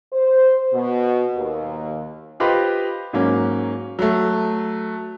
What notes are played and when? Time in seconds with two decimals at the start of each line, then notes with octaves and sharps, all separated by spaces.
0.13 C5
0.74 B2
1.35 D#2
2.40 F4 G4 B4 C5 D#5 F5
3.13 G#2 F#3 A#3 C#4
3.99 F#3 A3